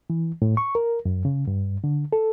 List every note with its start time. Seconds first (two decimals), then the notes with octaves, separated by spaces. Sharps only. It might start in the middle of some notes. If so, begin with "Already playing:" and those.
0.10 E3
0.42 A2
0.57 C#6
0.75 A#4
1.05 F#2
1.25 C#3
1.47 G2
1.84 D3
2.13 A4